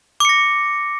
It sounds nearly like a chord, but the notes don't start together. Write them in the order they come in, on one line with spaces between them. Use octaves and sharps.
D6 C#7 A#6